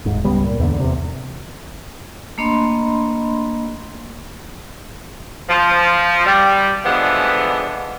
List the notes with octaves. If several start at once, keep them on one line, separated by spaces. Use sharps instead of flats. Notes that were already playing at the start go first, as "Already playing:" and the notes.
D#1 G#2
C#2 G3 B3
A#2
E2 G#2 D3
E2 C3
A3 A#3 D4 D#5 B5 C6
F3
G3
D3 E3 F3 G3 G#3 B3